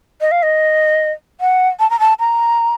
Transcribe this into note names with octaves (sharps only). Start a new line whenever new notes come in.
D#5
F5
D#5
F#5
A5
A#5
A5
A#5